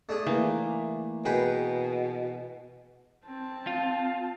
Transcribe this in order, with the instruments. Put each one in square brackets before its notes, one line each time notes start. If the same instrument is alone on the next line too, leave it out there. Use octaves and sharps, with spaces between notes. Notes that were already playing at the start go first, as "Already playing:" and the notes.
[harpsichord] A3 D4 G#4
[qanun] E3 A#3
[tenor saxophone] B2 [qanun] G#4 [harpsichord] A#4 B4 G5
[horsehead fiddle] C4 A5
[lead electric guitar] F4